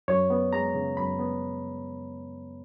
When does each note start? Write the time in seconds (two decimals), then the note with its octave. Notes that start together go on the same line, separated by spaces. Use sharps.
0.08 F#2 C#5
0.30 B3
0.53 G#3 A#5
0.75 C#3
0.97 F#2 B5
1.19 B3